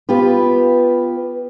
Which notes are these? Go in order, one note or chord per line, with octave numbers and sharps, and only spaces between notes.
B3 F4 G4 B4